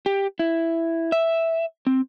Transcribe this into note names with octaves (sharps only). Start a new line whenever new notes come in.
G4
E4
E5
C4